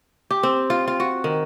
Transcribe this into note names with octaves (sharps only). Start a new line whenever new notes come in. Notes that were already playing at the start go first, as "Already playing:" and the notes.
G4
C4
F4
F4
F#4
D#3